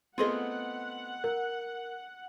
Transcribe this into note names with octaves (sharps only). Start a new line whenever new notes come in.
A3 B3 C4 F4 G#4 D#5 F#5
A#4 F#6